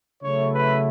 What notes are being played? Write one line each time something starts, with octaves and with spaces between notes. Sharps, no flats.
C#3 F#3 A3 E4 C#5
B4